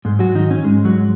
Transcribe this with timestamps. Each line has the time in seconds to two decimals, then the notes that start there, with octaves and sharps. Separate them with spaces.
0.05 G#2 G#3
0.19 F#3 F#4
0.35 D#3 D#4
0.51 C#4
0.64 G#2 G#3
0.85 F#3 F#4